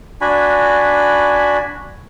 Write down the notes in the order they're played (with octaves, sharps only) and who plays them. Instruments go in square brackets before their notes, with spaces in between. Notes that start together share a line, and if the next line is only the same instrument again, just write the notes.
[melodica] D4 F#4 G#5 B5